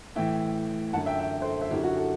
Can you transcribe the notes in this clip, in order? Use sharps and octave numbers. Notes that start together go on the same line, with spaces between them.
A2 E3 E5 G5
F#2 D3 F#5 A5
E5 G5
E5 G5
A4 C5
C5 E5
F#2 D3 E4 G4
F#4
F#4 A4